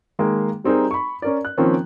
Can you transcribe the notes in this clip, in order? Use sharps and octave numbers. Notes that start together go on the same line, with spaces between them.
D#3 G#3 A#3
G3 C4 D#4 G#4 A#4
B5 C#6
C#4 A#4 D5
F#6
D#3 F3 A#3 C4 C#4